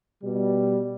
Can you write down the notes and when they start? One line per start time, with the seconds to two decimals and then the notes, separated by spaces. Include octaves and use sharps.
0.23 B2 G3